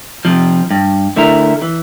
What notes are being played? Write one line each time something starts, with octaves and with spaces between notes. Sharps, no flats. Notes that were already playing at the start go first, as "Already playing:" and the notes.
C3 F3
G2
D3 A3 E4 A#4
E3